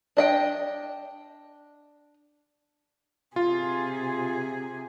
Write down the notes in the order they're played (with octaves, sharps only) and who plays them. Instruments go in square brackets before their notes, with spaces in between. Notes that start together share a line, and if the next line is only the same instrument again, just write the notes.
[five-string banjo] D4 D#5 G5
[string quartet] C3 G#4 [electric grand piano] F4